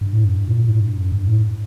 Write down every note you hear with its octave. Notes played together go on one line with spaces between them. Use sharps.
G2
A2
F#2
G2
A#2
A2
G2
F#2
G2
A2